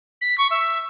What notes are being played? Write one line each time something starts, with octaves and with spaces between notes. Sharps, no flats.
B6
C#6
E5